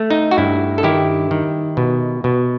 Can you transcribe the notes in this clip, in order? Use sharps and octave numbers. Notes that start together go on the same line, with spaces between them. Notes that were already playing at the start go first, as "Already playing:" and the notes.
Already playing: A3
D#4
F#4
G2 E4
A4
D#3 E4 G4
D#3
B2
B2